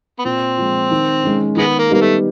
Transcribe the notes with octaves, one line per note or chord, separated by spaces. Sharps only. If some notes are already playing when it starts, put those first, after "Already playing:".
B3
A#2 C4
F3 G#3
D#3
G#3 C#4
D#3 G#3 B3
A#3
G3 A#3 B3 D#4 G4
A3